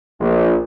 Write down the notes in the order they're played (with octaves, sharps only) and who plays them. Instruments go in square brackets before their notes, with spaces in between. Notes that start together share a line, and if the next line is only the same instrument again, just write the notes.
[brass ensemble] A#1